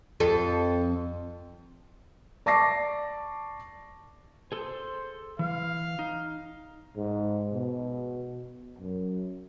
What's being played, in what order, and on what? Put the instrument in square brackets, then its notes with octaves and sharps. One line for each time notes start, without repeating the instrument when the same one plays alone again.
[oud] F2 A4
[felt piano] D5 A5 C#6 D6 A#6 C7
[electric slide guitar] G#4 A4 [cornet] C5
[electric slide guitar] E3 [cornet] F5
[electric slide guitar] D#4
[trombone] G#2
B2
F#2